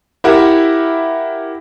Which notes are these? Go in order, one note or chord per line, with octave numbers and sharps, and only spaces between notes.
E4 G4 A#4 E5 F#5